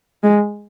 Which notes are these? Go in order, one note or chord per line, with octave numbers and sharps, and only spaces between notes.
G#3